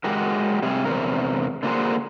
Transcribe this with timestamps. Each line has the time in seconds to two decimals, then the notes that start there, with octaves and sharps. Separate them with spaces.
0.04 G#3 F#4 G4 A#4
0.62 C3 G3 G#4
0.85 E2 C3 A#4
1.63 D3 A3 A#3 F#4 G#4 C5